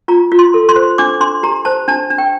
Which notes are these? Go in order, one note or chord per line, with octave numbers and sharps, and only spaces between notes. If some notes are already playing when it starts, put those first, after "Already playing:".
F4 A#5
F4
C6
A4
C6
C5
D4 D6
D4 C6
G4 A#5
C5 A5
D4 A5
D4
G5